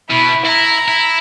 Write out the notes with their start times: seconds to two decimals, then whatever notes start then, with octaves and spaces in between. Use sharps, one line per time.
0.10 B2 E4
0.45 E4 A#5
0.88 E4